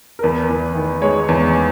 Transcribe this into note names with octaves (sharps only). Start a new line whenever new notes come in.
A#4
E2 B4
E2
D#3
G#3 C#5
E2